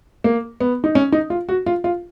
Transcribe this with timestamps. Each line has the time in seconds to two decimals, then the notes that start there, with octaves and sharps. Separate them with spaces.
0.24 A#3
0.60 B3
0.84 D#4
0.95 C#4
1.12 D#4
1.30 F4
1.49 F#4
1.66 F4
1.84 F4